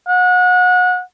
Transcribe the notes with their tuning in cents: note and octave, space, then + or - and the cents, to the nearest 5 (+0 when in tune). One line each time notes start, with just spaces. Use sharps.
F#5 -30